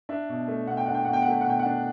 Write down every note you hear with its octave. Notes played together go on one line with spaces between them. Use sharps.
D4 E5
B2
A3
B2 F#5
G5
D4 F#5
G5
B2 F#5
G5
F#5
A3 G5
F#5
B2 G5
F#5
D4